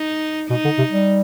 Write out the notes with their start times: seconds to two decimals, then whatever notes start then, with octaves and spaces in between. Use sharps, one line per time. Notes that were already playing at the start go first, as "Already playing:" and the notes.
Already playing: D#4
0.50 B2 D#4
0.64 D3
0.78 C3
0.92 G3